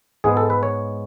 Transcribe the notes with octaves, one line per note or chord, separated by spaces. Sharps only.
G#2 G#3 B3 G#4
A4
B4
C#5